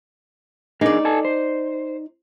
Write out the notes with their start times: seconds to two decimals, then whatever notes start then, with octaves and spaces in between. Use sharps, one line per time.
0.81 D4 D#4 G#4 A#4 D5
1.05 A4 G#5 A5
1.25 C5